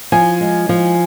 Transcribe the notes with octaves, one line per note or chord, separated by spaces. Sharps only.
F3 G#5
G#3
F3